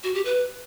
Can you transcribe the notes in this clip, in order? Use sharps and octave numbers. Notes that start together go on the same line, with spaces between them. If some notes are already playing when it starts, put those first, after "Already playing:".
F#4
G4
B4